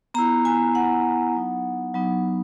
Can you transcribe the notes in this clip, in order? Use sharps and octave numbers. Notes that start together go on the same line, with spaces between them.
B3 E4 A#5
G#5
B3 E4 F#5
F#3 B3 D#4
F#3 B3 D#4